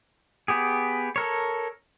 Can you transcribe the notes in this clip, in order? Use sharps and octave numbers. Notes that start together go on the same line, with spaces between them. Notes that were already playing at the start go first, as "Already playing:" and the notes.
B3 G4 G#4
A4 A#4 C#5